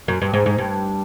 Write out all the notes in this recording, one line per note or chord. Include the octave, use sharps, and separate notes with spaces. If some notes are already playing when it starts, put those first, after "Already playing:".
F#2
G2
G#2
G#2
G2